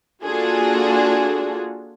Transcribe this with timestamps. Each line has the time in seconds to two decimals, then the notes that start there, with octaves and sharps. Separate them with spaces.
0.24 A#3 D4 F4 F#4 G#4 A4